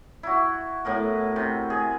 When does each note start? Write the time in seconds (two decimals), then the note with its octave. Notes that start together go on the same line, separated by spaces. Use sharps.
0.23 E4 F#4
0.85 A2 B3 A#4
1.36 C3
1.70 G#4